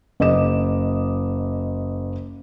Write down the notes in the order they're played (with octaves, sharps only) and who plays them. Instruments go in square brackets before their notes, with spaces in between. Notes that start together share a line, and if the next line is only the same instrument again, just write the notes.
[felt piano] F#1 D#5 D6 E7